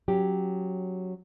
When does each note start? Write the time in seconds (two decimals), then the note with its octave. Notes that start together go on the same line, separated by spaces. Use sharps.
0.08 F#3 C#4 G4